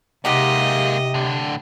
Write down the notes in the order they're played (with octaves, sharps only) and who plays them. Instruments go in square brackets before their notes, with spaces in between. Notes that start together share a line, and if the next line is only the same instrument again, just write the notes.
[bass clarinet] C3 [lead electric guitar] G#3 A#3 [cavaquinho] D#4 G4 F#5 [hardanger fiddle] D#5
[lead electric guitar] A2 D3